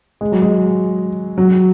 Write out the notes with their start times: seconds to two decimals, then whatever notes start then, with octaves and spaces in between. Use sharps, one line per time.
0.21 G#3
0.32 F#3
0.42 G#3
1.38 F#3